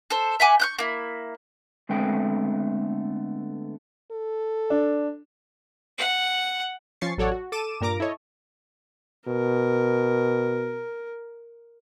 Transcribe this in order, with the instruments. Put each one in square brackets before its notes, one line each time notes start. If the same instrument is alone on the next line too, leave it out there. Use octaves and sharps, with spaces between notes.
[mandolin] A4 C5
E5 F#5 G#5 D6
C#6 F#6 G6
A#3 E4
[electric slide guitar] D3 G#3 A3 B3 C4 G5
[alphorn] A4
[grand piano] D4
[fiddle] F#5
[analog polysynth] F3 C#4 C#6 A6 C7
A1 F#3 A4 C#5 D5 F#5
F#4
A4 D6 D#7 E7
G2 A#2 A#4 A#5 D6 A#6
E4 A4 C#5 D#5
[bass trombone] B2 [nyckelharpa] A#4